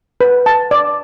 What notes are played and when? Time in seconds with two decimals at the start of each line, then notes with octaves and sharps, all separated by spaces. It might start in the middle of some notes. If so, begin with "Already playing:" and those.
0.21 B4
0.46 A5
0.71 D5